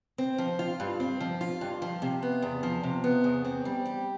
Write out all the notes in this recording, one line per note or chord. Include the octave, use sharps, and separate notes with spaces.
C4
F3
F4
G2
C4
F3
F4
G2
F3
C3
B3
E2
F3
C3
B3
E2
C4
G3
G4